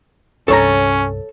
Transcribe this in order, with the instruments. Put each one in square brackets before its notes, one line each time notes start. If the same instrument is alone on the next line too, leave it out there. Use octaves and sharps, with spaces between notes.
[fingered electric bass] C2 G2 [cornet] C#4 [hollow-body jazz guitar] A4 C#5 A#5